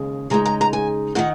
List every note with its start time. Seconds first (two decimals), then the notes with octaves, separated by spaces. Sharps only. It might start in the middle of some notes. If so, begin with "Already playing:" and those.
Already playing: D#2 C#3 G#3
0.30 C#3 G#3 D#4 A#5
0.46 A#5
0.61 A#5
0.73 G#5
1.15 D#3 A#3 D#4 F#5